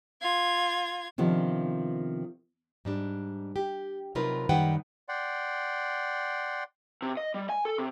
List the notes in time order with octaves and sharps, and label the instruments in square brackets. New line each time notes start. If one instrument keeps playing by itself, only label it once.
[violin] F4 G#6
[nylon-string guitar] C3 D#3 F3 B3 D4
G#2 G3 D4
G4
C3 F#3 D#4 F4 A#4 B4
F#2 D#3 G3 B4 F#5 G5
[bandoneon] D5 F#5 G5 C6
[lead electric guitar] C3
D#5
G3
G#5
A4
C3